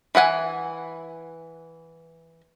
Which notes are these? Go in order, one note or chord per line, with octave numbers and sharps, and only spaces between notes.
E3 E4 F#5 G#5